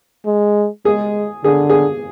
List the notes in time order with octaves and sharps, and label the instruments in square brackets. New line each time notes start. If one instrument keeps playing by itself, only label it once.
[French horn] G#3
[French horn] G#3 [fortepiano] G#4
[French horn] D3 [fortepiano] G#4
[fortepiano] G#4